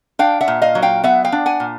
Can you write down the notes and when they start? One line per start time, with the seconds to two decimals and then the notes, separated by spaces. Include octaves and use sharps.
0.19 D4 F5 G5
0.41 E5 F#5
0.48 A#2
0.62 D#5 F5
0.75 F#3
0.82 F5 G5
1.03 B3 E5 F#5
1.24 F5 G5
1.32 D4
1.46 F#5 G#5
1.60 A#2